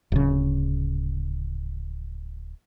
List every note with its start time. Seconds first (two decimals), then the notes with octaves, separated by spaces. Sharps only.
0.12 D1 C#3